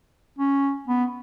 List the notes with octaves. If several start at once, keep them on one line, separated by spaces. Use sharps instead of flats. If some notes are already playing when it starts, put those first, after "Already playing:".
C#4
B3